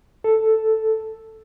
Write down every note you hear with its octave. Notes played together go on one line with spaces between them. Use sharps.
A4